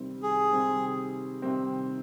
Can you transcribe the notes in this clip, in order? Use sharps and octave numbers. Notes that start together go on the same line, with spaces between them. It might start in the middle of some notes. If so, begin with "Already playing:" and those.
Already playing: C3 D#3 G3 C4
G#4
C3 D#3 G3 C4
C3 D#3 G3 C4